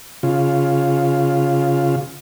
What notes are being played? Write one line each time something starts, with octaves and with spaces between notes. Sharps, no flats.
C#3 F4